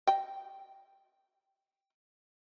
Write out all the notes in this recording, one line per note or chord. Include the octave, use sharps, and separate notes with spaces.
D#5 G5